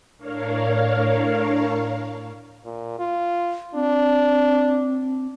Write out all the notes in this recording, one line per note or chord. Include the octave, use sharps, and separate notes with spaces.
A2 D4 A#4 C#5 F5
A#2
F4
C4 D4